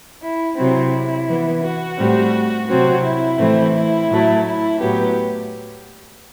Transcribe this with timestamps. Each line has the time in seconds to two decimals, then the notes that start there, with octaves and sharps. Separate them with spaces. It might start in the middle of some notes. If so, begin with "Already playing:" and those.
0.22 E4
0.57 C3 F#3 C4 E4
1.27 E3 B3
1.62 F#4
1.98 A2 G3 C4
2.68 C3 F#3 C4 F#4
3.04 E4
3.38 A2 E3 A3 C4
3.74 E4
4.09 A2 F#3 A3
4.44 E4
4.80 A2 F#3 B3 G4